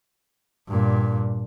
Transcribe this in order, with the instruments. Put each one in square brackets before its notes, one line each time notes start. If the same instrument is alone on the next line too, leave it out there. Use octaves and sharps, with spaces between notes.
[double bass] G2 A#2